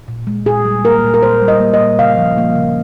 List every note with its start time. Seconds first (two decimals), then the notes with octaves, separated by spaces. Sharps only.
0.08 A#2
0.27 G#3
0.46 A#2 G#4
0.65 G3
0.84 A#3 A#4
1.04 A#2
1.14 A#4
1.22 A#2 C5
1.42 G3
1.48 D#5
1.60 A#3
1.74 D#5
1.80 A#2
1.99 C#3 F5
2.18 F3
2.38 A#3
2.56 C#3